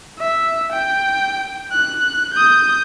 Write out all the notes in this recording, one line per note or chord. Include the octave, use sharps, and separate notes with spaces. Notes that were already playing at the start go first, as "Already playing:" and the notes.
E5
G5
F#6
D#6 G6